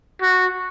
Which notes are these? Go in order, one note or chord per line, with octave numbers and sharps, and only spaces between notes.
F#4